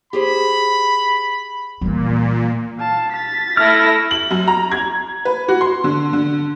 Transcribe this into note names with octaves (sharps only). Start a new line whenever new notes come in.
G4 G#4 C5 B5
A#2 E3 G3
F5 A5
A6 B6
A3 E4 F6 A#6
F#7
F#2
A#5
G#6
B4
F#4
C6
D3
D3